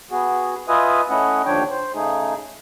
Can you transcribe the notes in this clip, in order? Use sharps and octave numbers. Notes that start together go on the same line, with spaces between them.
B3 F#4 G#4
F4 B4 D#5 E5 G#5 D#6
A3 C#4 E4 D#5 F#5
D#2 D3 F3 D4 C#5 G5
C5
C#3 A3 D#4 G#4